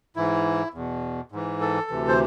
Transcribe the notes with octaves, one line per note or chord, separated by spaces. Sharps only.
G#2 E3 E4
E2 B2
G#2 E3
A4
D2 C3 E3
C5